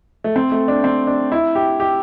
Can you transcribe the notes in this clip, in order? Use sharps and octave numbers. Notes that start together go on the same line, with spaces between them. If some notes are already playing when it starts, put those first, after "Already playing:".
A3
C4
A3
D4
C4
D4
E4
G4
G4